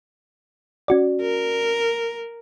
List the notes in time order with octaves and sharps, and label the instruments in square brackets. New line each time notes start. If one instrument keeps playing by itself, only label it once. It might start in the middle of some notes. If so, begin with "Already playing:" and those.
[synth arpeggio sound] C#4 F#4 D5
[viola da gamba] A#4